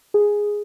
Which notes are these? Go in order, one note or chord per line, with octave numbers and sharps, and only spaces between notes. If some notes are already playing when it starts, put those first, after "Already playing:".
G#4